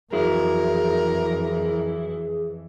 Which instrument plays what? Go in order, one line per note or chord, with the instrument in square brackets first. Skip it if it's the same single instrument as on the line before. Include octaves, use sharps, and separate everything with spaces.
[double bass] F2 E3 [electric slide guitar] F#3 E4 [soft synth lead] G#4 [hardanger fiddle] A#4